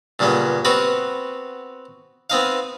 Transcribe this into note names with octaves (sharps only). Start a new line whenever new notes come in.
G2 A#2 C#3 F#3 B3
B3 C4 F#4 A#4 B4
B3 C4 D#4 F5